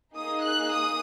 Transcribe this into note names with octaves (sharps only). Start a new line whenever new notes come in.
A#3 D#4 G#4 D#6
F#6
D#6